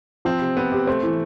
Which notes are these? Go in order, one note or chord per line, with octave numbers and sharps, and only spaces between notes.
F3 C4
C3
C3 B3
G4
A3 C4
E3